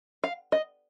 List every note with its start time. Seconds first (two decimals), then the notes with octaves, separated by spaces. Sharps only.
0.24 F5
0.52 D#5